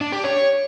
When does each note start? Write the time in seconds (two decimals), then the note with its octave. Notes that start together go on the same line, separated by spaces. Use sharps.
0.01 D4
0.12 G4
0.24 C#5